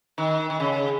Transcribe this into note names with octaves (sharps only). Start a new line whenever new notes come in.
D#3
D#3
C#3